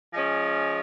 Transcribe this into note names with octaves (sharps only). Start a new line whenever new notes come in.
F3 G#3 C#4